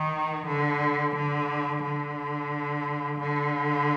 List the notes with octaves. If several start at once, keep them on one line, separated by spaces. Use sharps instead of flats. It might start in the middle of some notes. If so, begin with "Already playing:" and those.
Already playing: D#3
D3
D3
D3
D3